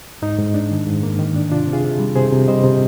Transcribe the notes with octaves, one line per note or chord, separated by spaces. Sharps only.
G#2 D#4
G#2
D4
D#3
G#2
A#3
D#3
D4
C3 D4 F4
C3
F4 G#4
C3
G3
C3 G#4 C5
C3
G3 C5 D#5
C3